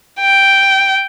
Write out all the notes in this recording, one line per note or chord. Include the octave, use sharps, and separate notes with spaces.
G5